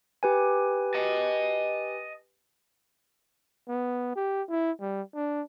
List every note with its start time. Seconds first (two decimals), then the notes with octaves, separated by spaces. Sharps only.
0.23 G4 B4 G#5
0.94 D#5 A5
3.68 B3
4.16 G4
4.50 E4
4.81 G3
5.15 D4